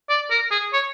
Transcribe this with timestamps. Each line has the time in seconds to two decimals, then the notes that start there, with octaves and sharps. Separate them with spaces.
0.09 D5
0.31 A#4
0.51 G#4
0.73 C#5